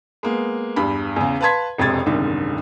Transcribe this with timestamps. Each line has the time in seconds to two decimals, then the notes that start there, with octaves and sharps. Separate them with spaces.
0.23 G#3 A#3 B3
0.76 E2 G2 B5
1.16 E2 C#3
1.41 B4 F5 A5 C6 G#6 B6
1.78 E1 F2 C3 G#3 G#6 A6
2.06 F#1 C2 G#2 D3 D#3